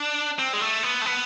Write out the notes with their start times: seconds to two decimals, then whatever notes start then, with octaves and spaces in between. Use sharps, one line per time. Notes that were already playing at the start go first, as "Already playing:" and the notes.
Already playing: D4
0.39 C4
0.53 G#3
0.61 A3
0.83 B3
1.02 A3
1.06 B3